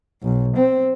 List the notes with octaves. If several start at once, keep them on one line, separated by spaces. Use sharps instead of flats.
B1
C4